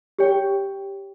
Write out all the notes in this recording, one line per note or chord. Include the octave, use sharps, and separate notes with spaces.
G4 C#5 G5 C#6